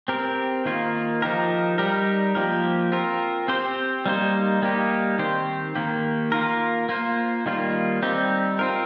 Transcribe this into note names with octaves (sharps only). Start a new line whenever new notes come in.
C4 G4 A#4
D#3 A#3 F4
F3 D#4 G4 A#4
G3 D#4 G4 A#4
F3 A#3 G4 A#4
C4 F4 A#4
C4 G4 C5
G3 A#3 D#4 C5
G3 A#3 D#4 G4
D#3 C4 G4 C5
D#3 A#3 G4
A#3 F4 A#4
A#3 F4 C5
D#3 G3 A#3 F4
G3 C4 D#4 G4
C4 F4 A#4